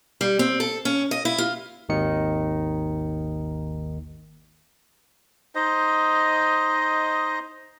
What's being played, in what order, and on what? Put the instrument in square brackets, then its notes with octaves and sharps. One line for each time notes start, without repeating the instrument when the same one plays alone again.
[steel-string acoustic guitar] G3
C4
A4
C#4
D#5
E4
F4
[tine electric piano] G#1 D#2 D#3 D#4 C#7
[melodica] D#4 C5 D#5